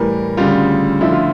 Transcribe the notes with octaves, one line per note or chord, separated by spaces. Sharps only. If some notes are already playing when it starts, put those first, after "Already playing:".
Already playing: A2 E3 G3 A#4
D2 C#3 G3 F4
D2 D3 F3 E4
F4